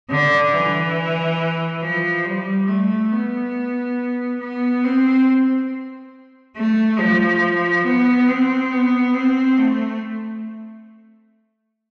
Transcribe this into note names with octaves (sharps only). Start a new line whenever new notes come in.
D3
E3
F3
G3
A3
B3
B3
C4
A3
F3
B3
C4
B3
C4
A3